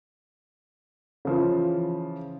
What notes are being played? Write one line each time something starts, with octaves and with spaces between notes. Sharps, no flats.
C#3 E3 F3